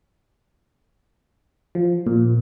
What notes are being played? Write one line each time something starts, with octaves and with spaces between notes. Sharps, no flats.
F3
A#2